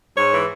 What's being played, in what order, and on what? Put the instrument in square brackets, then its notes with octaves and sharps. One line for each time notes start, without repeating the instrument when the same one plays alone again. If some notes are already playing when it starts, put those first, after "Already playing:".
[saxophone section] G#2 C#5
E3